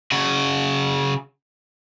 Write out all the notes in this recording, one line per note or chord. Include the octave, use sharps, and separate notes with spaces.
C#3 F#4